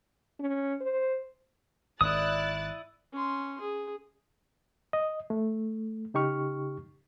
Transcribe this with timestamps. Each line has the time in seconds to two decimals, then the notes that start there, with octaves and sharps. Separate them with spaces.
0.39 C#4
0.81 C5
2.01 G#1 E4 D5 D#6 F#6 A6
3.13 C#4 C6
3.61 G#4
4.93 D#5
5.30 A3
6.14 C#3 D#4 G4 C#6 F6